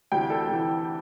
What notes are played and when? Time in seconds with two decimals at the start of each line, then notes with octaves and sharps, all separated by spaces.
0.12 D2 C3 E3 G5
0.30 A4
0.49 D2 C3 E3